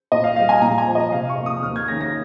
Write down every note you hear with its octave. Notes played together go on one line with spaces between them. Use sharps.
A#2 D#5
F5
G3 C4 F5
G#5
A#2 A#5
G#5
F3 C4
D#5
C3 F5
C#6
F3 A#3
D#6
D#2 F6
G#6
D#3 A#3 C#4 A#6
A#6